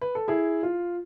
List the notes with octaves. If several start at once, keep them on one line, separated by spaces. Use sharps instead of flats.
B4
A4
E4 G#4
F4